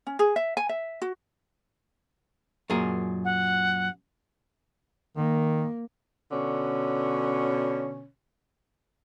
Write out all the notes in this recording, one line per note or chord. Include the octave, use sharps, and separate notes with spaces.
C#4
G#4
E5
G#5
E5
F#4
F#2 A#2 G#4
F#5
D#3 A#3
B2 D3 C#4